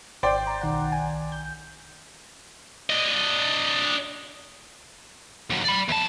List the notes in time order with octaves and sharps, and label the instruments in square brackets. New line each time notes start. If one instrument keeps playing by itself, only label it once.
[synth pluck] G#1 C6 G6 [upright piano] C5 D5 G5
[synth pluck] A#5
B1 D#3 F#5
G#5
G6
[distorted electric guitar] D4 D#5
D#2 F#3
D5 B5
E2 A5